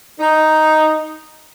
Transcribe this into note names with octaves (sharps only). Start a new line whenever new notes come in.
D#4